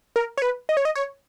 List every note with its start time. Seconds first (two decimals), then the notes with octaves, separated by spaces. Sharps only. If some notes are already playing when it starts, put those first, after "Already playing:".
0.16 A#4
0.38 C#5
0.42 B4
0.69 D#5
0.77 C#5
0.85 D#5
0.95 C#5